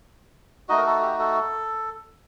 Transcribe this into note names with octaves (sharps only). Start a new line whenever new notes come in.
A3 D#4 F#4 D#5
A#4
A4
G4
A4